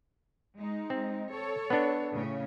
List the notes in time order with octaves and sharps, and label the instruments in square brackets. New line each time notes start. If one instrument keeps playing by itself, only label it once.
[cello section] G#3 D#4
[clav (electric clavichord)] C4
[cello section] A4 C#5
[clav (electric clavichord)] B3 D4
[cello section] A2 C#3 C#4